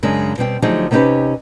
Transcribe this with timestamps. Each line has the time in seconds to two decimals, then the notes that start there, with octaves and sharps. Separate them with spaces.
0.03 F#2 C#3 G#3 D4
0.38 B2 G3 C4 G5
0.62 D3 F3 F#3 A3 D#4 G#4
0.91 C3 B3 C#4 D#4 G4 B4